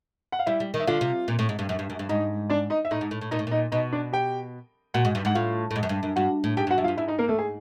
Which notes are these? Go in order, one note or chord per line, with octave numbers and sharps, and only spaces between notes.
F#5
F5
G3 E4 E5
G3
D#3
E5
D3 F4 F5
C3
A#2
A2
G#2
G2
F#2
G2
F#2
G2
G#2 D#4 D#5
D4 D5
D#4 D#5
E5
A2 D#4 D#5
G#2
A2
A2
A#2 D#4 D#5
A2
A#2 D#4 D#5
B2 D#4 D#5
D4 D5
G4 G5
A#2 F#4 F#5
G#2
G2
G#2 F#5
A2 F4 F5
A2
G#2
F#2
G2
F#2
G2 F#4 F#5
A2
G#2 G4 G5
G2
F#4 F#5
F#2 E5
F4 F5
G2
G#2 E4 E5
D#4 D#5
A#3 A#4
A3 A4
G#4